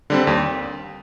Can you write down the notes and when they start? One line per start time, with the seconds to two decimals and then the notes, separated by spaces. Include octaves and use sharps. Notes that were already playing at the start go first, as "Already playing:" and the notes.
0.10 D3 G3 C4
0.27 D#2